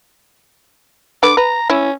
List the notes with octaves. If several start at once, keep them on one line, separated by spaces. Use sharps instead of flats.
D3 B4 D6
B4 A#5
C#4 E4